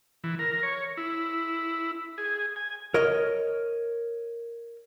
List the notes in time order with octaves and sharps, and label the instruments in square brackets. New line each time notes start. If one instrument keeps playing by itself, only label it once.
[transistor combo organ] E3
A#4
C#5
E4
G#4
G#5
[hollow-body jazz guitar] A#4 C#5 D#5